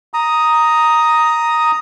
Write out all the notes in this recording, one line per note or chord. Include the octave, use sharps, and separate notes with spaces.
A#5 D#6